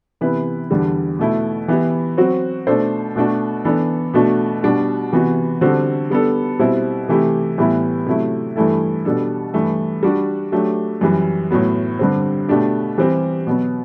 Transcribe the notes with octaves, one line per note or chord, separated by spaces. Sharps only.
C3 E3 B3 E4 B4
E2 D3 G3 D4
B2 A3 E4
E3 B3 E4 G4
F#3 C4 F#4
B2 A3 D4 A4 C5
B2 A3 D4 F#4
E3 B3 D4 A4
B2 A3 D4 F#4
B2 G3 D4 F#4
C3 E3 B3 F#4
D3 G3 C4 F#4 A4
G3 B3 D4 A4
B2 G3 C4 E4
C3 E3 A3 E4 G4
A2 E3 G3 B3 E4
C3 F#3 A3 E4
G2 E3 A3 E4 A4
B2 G3 D4 A4
G2 E3 A3
G3 D4 F#4
F#3 A3 D4 G4
F#2 E3 G3
A2 F#3 B3
G2 D3 G3 C4
B2 A3 D4 G4
E3 G3 C4 G4
B2 F#3 B3